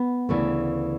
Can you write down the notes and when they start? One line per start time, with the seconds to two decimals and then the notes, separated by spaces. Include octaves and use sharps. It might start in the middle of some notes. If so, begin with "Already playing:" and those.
Already playing: B3
0.29 D2 C#3 E3 A3